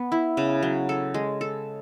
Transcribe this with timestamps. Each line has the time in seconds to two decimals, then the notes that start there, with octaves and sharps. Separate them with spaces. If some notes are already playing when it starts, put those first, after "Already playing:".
Already playing: B3
0.12 E4
0.37 C#3
0.62 F#3
0.89 A4
1.14 G#3
1.41 A4